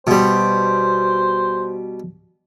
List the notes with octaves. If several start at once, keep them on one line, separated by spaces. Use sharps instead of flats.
B2 G3 C5